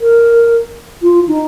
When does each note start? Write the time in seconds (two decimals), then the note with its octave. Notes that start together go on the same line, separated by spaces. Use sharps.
0.01 A#4
1.02 F4
1.28 D#4